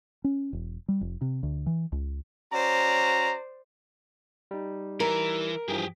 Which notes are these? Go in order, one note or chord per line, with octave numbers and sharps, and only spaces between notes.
C#4
E1
G3
F1
C3
D2
E3
C#2
C#4 F#4 C5 D5 A#5
G3 D#4
E3 A#4
G2 E3 F3 G4 G#4